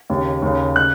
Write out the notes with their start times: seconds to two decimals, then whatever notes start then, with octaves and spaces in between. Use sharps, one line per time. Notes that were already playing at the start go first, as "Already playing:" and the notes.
0.10 D#2 C#3
0.42 D#2 C#3
0.76 C#3 F#6